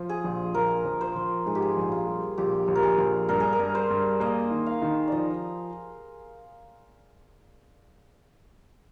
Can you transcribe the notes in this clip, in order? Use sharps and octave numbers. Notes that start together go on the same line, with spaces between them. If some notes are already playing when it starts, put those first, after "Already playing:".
Already playing: F3 F4
G#4
A#1
A#1 A#4
F3
C5
F3
G#2 G#4
G4
G#4
A#1
F4
G3
A#1 G4
A#1
A#4
G#4
A#1
G2 A#4
G#4
A#4
G2
C5
G2
A#3 D#5
D#3
F5
D#3
F3 D5 D#5